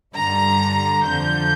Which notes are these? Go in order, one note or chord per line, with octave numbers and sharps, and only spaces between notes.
G2 D3 G3 A#5
F2 D3 F3 G6